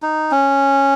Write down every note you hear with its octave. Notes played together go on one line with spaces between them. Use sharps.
D#4
C#4